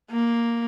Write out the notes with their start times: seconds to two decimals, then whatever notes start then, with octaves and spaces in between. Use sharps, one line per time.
0.11 A#3